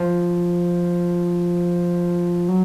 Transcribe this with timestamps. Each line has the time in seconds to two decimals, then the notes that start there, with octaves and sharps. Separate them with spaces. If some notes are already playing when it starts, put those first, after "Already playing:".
Already playing: F3
2.48 F#3